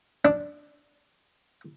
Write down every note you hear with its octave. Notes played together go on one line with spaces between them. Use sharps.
D4